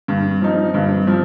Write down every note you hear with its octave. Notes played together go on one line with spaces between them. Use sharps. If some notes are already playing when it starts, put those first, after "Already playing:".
G2
F3 D#4
G2
F3